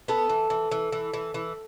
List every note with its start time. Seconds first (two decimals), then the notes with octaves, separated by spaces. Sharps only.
0.08 B3 A4
0.29 E3
0.50 E3
0.71 E3
0.92 E3
1.13 E3
1.34 E3